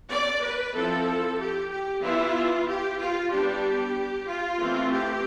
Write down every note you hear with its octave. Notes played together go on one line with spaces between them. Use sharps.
D5
B4
F3 C4 E4 A4
G4
G4
E3 B3 E4 F4
G4
F4
G3 B3 D4 G4
F4
E3 A3 C4
G4